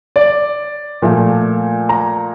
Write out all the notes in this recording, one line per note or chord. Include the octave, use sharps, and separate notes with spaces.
D5
A#2 F3 A3
A#5